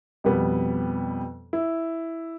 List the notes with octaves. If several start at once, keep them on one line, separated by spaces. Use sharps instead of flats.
F2 B2 G3 B3
E4